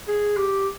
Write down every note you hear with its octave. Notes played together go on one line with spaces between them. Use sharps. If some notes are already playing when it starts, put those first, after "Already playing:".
G#4
G4